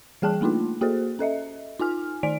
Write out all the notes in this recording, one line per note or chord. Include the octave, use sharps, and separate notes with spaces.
E3 G3 G#4 G5 A5 F#6
A3 A#3 D4 D#4 F4
A#3 F#4 G#4 A4 C5
C#4 A4 D#5 E5
D#4 F4 G#5 F6
D#3 D#4 D5 G#5 D7